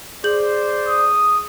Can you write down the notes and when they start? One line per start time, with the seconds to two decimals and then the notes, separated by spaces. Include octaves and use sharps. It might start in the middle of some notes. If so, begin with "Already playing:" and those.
0.24 G#4 C5 D5 G6 F#7
0.88 D#6